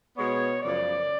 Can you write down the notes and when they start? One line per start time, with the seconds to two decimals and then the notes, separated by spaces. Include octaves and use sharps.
0.17 B2 G#3 B3 C#5
0.62 F#2 C#3 F3 D5